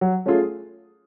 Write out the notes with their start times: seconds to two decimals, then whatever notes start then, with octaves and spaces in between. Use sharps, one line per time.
0.01 F#3
0.26 A3 C#4 F4 G#4